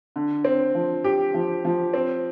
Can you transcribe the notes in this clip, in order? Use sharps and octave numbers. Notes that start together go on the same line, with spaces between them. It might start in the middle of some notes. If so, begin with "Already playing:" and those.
D3
C4
F3
G4
F3
F3
C4